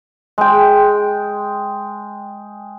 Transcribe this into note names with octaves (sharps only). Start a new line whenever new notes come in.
G#3 G5